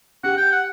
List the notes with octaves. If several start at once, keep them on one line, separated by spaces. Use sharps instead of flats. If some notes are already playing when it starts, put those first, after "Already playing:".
G4 F#5
G5
F#5